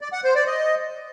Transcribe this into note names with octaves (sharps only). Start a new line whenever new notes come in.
D5
F#5
C5
D5
D#5